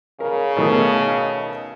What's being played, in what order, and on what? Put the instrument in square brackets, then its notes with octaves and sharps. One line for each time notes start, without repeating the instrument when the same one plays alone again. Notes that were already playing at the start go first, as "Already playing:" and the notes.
[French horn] C#3 [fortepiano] A#4
[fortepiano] B2 D#3 A3